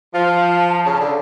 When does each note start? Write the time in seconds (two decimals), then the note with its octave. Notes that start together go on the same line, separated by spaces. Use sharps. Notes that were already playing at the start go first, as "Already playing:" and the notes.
0.14 F3 F4 A5
0.86 C#3
1.00 D3